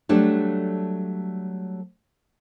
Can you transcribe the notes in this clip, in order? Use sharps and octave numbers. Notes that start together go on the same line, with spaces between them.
F#3 G3 A3 D4 G4 A4